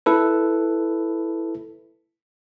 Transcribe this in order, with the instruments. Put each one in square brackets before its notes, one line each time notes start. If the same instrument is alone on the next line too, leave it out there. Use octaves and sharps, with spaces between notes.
[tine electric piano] E4 A4 B4